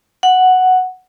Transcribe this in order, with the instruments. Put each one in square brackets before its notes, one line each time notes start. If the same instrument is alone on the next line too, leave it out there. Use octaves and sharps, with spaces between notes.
[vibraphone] F#5